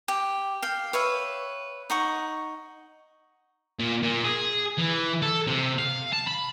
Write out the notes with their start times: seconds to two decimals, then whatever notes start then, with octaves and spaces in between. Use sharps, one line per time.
0.08 G4
0.62 F5 G5
0.93 B4 C#5 E5 F5
1.90 D#4 F#5 C#6
3.79 A#2
4.03 A#2
4.24 G#4
4.78 E3
5.22 A4
5.47 C3
5.78 F5
6.13 A5
6.28 B5